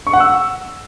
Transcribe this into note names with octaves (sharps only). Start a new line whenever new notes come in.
C#6
F#5
E6